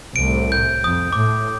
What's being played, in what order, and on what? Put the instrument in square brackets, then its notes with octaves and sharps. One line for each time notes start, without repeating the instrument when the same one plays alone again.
[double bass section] C2 A2 [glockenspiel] D7
[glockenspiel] G6
[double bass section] F2 [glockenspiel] D#6
[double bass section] A2 [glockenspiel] D6